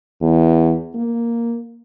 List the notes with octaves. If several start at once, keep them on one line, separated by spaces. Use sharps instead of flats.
E2
A#3